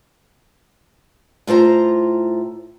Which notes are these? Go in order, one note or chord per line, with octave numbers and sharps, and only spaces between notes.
A2 F4 C5 A#5